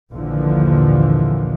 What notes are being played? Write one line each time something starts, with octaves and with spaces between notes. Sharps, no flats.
A#1 D#2 A#2 D3 E3 F3